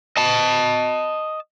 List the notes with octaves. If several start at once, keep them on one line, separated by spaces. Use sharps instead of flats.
D#5 A5